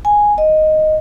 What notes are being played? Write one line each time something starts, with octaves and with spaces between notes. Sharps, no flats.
G#5
D#5